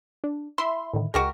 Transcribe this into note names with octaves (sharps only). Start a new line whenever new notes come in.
D4
E4 E5 C6
A2 D3 D#3
C#2 G#3 F#4 G4 A#4